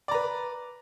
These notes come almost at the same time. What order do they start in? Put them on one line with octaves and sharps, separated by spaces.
D5 A#5 B4